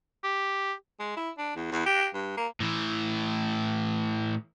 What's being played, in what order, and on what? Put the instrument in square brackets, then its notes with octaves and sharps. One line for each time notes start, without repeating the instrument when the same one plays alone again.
[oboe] G4
[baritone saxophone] G#3
E4
D4
E2
E2
G4
G2
A#3
[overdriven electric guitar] A2 E3